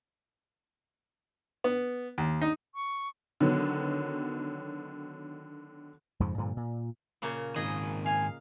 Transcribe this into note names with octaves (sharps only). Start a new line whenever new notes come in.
B3
D#2
D#4
C#6
D3 D#3 F#3 B3
F2 G#2 C#3 F3
G2 A#2 D3 F3
A#2
A#2 C#3 A#3
G#2 D#3 G#4 D#5
F5 G#5